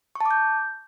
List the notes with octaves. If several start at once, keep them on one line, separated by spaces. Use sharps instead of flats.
C#6
A5
D6
G6